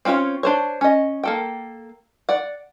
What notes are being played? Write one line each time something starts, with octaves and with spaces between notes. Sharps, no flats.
C4 C#4 F4 G#4 C#5
D4 C5 C#5
C#4 D#5
A#3 A4 G5
D5 F#5